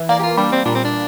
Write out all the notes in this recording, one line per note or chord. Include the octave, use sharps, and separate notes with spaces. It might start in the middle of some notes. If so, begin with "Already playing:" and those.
Already playing: E3
A#3 D5
G4
F4
G3 D4
C4
A#2 D4
C4
D4